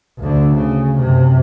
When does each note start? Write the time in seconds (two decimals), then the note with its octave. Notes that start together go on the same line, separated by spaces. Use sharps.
0.19 D2 D3
0.55 C#3
0.98 F#2 C3